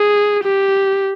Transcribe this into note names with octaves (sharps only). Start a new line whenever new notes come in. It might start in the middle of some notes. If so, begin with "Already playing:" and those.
Already playing: G#4
G4